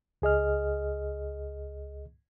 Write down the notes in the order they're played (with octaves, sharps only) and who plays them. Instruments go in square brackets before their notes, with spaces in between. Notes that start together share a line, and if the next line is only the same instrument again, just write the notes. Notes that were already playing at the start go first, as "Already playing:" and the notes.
[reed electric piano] C#2 G#4 D#5 F6